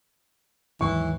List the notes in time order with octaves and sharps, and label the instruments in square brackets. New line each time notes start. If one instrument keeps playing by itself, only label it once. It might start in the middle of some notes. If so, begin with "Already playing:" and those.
[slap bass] D#2 G#2 F#3 [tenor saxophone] E3 [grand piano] C#6